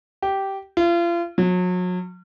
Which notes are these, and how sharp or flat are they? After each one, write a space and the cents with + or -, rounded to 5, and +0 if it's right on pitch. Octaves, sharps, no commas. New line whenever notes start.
G4 -10
F4 -35
F#3 -35